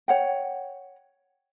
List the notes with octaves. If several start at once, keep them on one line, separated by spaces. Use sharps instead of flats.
C#5 F#5 G5